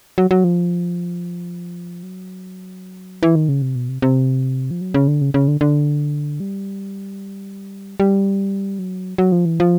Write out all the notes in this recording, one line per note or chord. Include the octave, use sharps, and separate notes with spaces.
F#3
F#3
F3
F#3
E3
D#3
C#3
C3
B2
C3
C3
F3
F#3
C#3
D3
C#3
C#3
D3
D3
G3
G3
F#3
F#3
F3
E3
F3